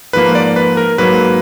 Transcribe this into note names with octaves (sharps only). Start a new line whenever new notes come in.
G#2 F3 A#3 B4
D5
B4
A#4
G#2 F#3 A#3 B4